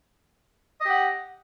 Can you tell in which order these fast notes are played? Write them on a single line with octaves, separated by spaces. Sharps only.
D#5 G4 F#5